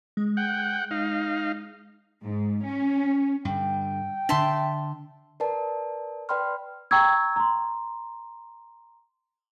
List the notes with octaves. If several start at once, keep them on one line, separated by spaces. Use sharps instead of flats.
G#3
F#5 G5
D#4 F5
G#2
C#4
G2 D3 G5
D3 D4 E5 A5 C6
A#4 B4 D5 A5
B4 D5 G5 B5 C6 F6
G5 A#5 C#6 E6 G#6
A#5 C6